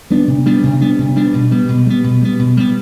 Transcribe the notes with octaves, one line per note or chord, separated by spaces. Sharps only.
G3 B3 D4
C3
G3 B3 D4
C3
G3 B3 D4
C3
G3 B3 D4
B2
G3 B3
B2
G3 B3
B2
G3 B3
B2
G3 B3